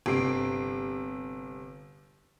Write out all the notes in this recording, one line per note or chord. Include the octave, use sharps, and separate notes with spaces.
G1 C3 C7 D7